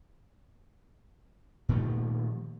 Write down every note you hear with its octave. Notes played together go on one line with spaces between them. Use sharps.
A#2 D#3 F3 A3